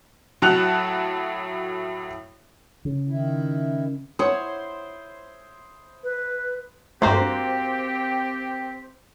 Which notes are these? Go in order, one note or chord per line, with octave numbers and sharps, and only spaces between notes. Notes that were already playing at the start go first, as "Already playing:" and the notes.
A2 F#3 F#5 A5 F#6 F7
C#3
D#3 E4
E4 C5 C#5 F#5 D#6
B4
G2 A3 A#3 C4 F#4 G4 C5